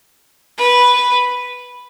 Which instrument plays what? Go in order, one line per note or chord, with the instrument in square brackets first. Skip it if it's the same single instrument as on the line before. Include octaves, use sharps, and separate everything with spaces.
[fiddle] B4